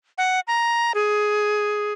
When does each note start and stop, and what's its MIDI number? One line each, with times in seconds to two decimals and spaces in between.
0.18 0.40 78
0.47 0.92 82
0.95 1.93 68